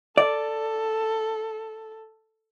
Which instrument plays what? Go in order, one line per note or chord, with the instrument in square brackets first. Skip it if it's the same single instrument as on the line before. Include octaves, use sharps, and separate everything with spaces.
[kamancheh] A4 [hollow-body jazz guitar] D5